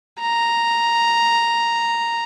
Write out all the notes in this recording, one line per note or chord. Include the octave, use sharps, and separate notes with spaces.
A#5